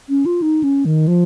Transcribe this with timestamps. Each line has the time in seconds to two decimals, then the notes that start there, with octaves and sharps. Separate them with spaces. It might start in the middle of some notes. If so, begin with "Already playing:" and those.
0.09 C#4
0.26 F4
0.42 D#4
0.63 C#4
0.86 D#3
1.08 F3